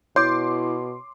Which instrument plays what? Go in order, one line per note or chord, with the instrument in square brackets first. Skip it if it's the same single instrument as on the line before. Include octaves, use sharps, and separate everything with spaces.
[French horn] B2 [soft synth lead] E4 [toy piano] C#5 [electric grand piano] C6 D6